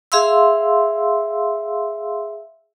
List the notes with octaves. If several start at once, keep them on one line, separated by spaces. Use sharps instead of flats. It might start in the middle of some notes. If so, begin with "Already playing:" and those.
G#4 E5 F5 C6 E6